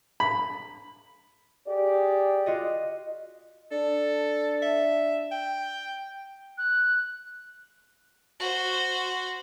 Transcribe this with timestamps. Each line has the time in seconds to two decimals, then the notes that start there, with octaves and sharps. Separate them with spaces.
0.20 B5
1.67 G4 G#4 D5
2.46 F4 F#4 D#5
3.72 D4 A4
4.62 E5
5.32 G5
6.58 F#6
8.40 F#4 C5